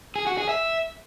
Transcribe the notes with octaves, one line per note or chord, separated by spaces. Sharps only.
G#4
F#4
G#4
E5